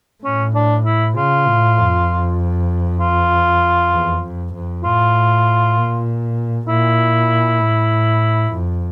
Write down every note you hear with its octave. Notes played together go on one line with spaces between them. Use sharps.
A2 C#4
D4
E4
C#3 F4
A2
F2
F4
E2
F2
F2
A2 F4
A#2
A#2 E4
A2
F2